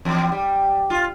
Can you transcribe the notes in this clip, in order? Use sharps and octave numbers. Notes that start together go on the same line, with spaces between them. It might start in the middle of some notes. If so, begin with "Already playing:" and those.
E2
G3
F4